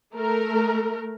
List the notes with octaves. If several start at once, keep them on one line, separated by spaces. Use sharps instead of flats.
A3 A#4